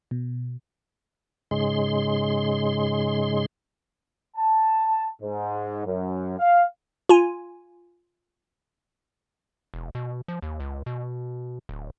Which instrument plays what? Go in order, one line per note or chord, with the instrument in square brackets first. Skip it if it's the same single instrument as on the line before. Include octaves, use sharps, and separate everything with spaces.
[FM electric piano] B2
[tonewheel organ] G#2 C#3 G#3 C6
[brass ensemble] A5
G#2
F#2
F5
[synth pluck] F4 G#5
[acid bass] E1
B2
F3
D#2
C#2
B2
D1